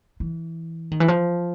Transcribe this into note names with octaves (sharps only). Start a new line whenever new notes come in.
E3
D#3
E3
F3